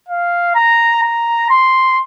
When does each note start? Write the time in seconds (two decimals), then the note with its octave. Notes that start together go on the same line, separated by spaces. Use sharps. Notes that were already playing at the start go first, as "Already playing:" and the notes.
0.08 F5
0.55 A#5
1.03 A#5
1.50 C6